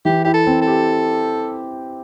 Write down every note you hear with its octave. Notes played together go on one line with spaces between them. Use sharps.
E3 G4
E4 G4
A4
C4
A4
G4